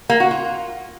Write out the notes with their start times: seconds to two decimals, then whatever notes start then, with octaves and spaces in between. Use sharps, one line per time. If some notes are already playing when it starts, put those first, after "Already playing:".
0.10 A#3
0.20 F#4
0.31 F4